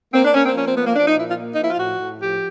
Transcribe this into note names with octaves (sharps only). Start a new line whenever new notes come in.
A#3 C4
D4
A#3 C#4
C4
F3 C#4
C4
A#3 B3
A#3
F3 D4
D#4
A#2 E4
F4
A#3
D#4
F3 E4
F4
A2 F#4
A2
F3 G4